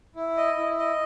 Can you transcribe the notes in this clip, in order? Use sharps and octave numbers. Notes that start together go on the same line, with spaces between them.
E4
D#5
E4
D#5